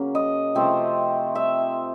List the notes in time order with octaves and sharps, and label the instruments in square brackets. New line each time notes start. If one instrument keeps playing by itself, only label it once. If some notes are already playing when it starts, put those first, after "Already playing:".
Already playing: [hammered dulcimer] C#3 F#3 A#3 C#4
D#5
C3 F3 A3 C4
E5